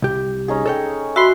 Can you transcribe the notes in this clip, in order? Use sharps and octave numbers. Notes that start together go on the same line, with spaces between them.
C2 G4
C#4 D#4 G#4
A4 C#5 G5
F#4 E5 B5 C6